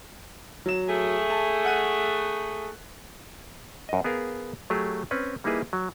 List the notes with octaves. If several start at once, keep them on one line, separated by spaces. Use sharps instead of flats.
F#3 E7
A3 G#4
A5
F#5 F#6 D#7
F#2 D#5
B3 G#4 A#4 F5
F#3 A3 G4 G#4
C4 C#4 B4
G3 A#3 D#4 E4 G#4 B4
F#3